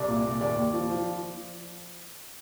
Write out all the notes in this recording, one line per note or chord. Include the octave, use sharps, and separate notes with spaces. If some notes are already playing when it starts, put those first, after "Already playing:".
Already playing: C2 D5
A#2
A#2
D#2 D5
D#2
F3
F3